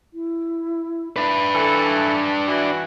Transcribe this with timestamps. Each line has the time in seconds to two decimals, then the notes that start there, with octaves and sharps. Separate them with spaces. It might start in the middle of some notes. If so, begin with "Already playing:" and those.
0.14 E4
1.16 D4 B4 E5
1.55 E3 A4 A5
2.47 E3 F#4